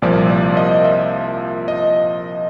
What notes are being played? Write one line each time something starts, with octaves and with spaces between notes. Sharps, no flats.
C2 A#2 F3 D5
D5
D#5
E5
D#5